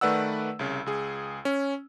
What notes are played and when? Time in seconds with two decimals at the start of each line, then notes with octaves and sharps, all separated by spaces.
0.01 D#3 A3 B4 D5 F#5 E6
0.59 C2 C#3
0.86 C#2 G#4
1.45 C#4